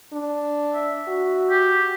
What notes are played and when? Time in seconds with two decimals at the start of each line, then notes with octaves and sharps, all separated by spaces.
0.13 D4
0.73 E5
1.08 F#4
1.50 G4